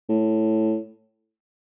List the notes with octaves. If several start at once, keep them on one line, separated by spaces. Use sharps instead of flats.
A2